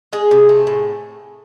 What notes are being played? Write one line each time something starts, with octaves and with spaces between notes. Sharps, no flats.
G#3 G#4
C3
A3
A2